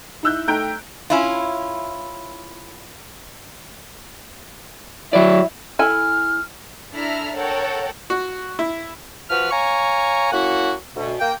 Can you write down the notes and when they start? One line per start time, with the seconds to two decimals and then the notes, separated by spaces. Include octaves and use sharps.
0.23 D#4 E4 E6 F#6 G6
0.48 A3 D#4 G5 A#5 G6 D7
1.10 C#4 E4 F4
5.13 F#3 E4 D5
5.79 E4 A4 G#5 F6
6.93 D4 E4 A4 E5 A#5 F6
7.33 A4 A#4 C#5 F#5 G5
8.10 F#4
8.59 E4
9.29 F3 F#4 B4 F6
9.51 C#5 F5 G#5 A#5 C#6
10.32 A#3 C#4 E4 F#4 F#5
10.95 D2 B2
11.20 A#3 G5